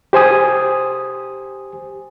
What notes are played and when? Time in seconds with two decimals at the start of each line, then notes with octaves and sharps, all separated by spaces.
0.13 G4 C5 G#5 D#6